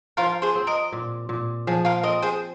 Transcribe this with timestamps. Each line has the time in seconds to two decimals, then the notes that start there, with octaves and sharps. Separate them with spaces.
0.17 F3 F4 A#4
0.42 G#4 C5
0.55 C4
0.67 A#4 D#5
0.92 A#2
1.29 A#2
1.67 F3 G#4
1.85 F4 A#4
2.03 C4 A#4 D#5
2.22 G#4 C5